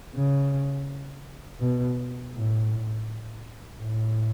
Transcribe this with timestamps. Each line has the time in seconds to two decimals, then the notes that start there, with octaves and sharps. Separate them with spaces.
0.15 C#3
1.60 B2
2.33 A2
3.79 A2